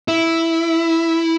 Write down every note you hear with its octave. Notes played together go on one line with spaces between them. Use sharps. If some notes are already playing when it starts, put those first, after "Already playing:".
E4